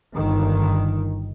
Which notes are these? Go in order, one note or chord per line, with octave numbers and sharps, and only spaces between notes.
G1 D#3